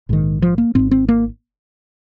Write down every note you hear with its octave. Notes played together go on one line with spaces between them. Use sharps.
A#1 G#2 D#3
F3
A#3
G#1 G#2 C4
C4
A#3